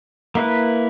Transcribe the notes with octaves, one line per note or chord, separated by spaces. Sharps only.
A#3 E4 B4